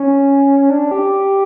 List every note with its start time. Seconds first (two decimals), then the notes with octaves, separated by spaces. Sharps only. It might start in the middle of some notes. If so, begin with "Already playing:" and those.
Already playing: C#4
0.70 D4
0.91 G4